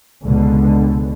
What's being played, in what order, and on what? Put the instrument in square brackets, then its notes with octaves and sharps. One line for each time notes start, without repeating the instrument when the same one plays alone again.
[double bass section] C#2 B2 D3